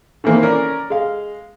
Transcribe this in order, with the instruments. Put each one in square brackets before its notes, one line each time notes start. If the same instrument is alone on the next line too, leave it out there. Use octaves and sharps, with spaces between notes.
[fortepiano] D#3 E3 A3 A#3 C4
C#4 A#4 D5
G#3 F5